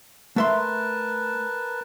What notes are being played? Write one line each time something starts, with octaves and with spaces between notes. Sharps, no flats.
A3 A#4 B4 E5 A5 C6